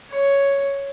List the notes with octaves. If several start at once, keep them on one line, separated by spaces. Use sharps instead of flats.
C#5